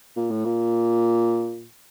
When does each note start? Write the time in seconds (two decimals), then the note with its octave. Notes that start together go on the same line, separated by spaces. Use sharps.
0.16 A#2
0.30 A2
0.45 A#2